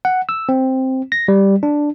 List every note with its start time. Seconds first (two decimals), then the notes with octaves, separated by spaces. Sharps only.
0.05 F#5
0.29 E6
0.49 C4
1.12 A#6
1.28 G3
1.63 D4